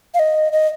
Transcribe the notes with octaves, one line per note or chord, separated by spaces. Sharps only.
F5
D#5
D#5